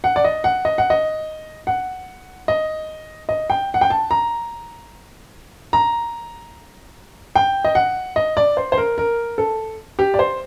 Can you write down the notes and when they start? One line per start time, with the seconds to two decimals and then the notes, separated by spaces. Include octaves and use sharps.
0.04 F#5
0.16 D5
0.24 D#5
0.44 F#5
0.65 D#5
0.78 F#5
0.90 D#5
1.67 F#5
2.48 D#5
3.29 D#5
3.50 G5
3.74 F#5
3.81 G5
3.90 A5
4.11 A#5
5.73 A#5
7.35 G5
7.65 D#5
7.75 F#5
8.16 D#5
8.37 D5
8.57 C5
8.72 C5
8.78 A#4
8.98 A#4
9.38 A4
9.99 G4
10.14 D5
10.19 C5